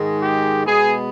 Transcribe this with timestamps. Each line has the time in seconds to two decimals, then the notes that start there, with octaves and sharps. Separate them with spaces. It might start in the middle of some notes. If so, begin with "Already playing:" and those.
Already playing: G#2 D#3 G#3
0.22 G4
0.65 B2 G#3 B3 G#4